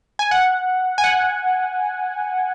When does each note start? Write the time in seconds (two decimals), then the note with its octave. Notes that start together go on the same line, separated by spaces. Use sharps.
0.19 G#5
0.31 F#5
0.98 G#5
1.04 F#5